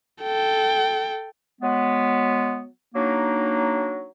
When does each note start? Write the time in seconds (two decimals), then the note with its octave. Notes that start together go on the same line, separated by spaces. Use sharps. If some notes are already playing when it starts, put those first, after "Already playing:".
0.21 A4 G5
1.61 F#3 G#3 B3
2.95 F#3 A#3 D4 D#4